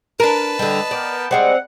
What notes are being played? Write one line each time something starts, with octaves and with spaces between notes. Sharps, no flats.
D4 A#4 B4 A5
D3 G3 D#5
B3 A#4 D5 G5
G3 G#3 C4 C5 F#5